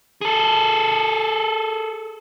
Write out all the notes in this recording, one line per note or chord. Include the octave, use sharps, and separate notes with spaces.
G#4 A4